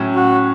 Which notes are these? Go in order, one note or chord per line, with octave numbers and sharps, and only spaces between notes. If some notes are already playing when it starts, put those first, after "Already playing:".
Already playing: A2 F#3 C#4
F#4